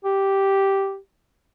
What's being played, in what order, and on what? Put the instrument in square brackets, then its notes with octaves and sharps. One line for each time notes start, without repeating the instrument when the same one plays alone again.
[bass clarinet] G4